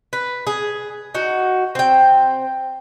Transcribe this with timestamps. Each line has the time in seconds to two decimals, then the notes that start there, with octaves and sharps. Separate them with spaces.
0.13 B4
0.47 G#4
1.14 D#4 F#4
1.75 C4 G5